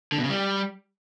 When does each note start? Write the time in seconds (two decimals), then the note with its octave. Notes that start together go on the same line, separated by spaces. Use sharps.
0.12 D3
0.18 B2
0.24 C#3
0.30 G3